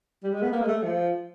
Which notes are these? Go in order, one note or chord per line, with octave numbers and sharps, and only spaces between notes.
G3
G#3
B3
A#3
G#3
A3
F3